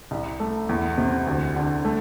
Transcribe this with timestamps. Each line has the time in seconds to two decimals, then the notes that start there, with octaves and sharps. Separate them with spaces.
0.11 C2
0.40 A3
0.69 E2
0.98 C3
1.27 D2
1.56 D3
1.85 A3